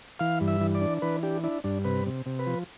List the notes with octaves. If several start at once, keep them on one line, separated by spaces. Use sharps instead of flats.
E3 F5
G2
E5
E3
D5
D4
E3 B4
D4 G4
D4 E4
G2 D4
C3 B4
C3
C3
B4
F3